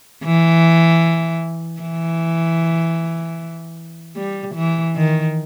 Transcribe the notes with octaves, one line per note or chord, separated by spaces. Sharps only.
E3
E3
G3
E3
D#3